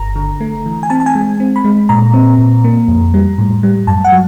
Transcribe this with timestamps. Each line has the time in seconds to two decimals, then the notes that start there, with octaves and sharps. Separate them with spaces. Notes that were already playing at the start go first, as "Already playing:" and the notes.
Already playing: G1 A#5
0.16 D3
0.41 A3
0.66 E3
0.83 G#5
0.90 C4 A5
1.00 A5
1.06 G#5
1.15 G#3
1.40 C4
1.56 B5
1.64 G#3
1.89 A#2 A#5
2.14 C4
2.38 A#2
2.64 A#3
2.88 F2
3.14 G3
3.38 A2
3.63 G3
3.87 F#2 A5
4.04 F#5
4.12 F#3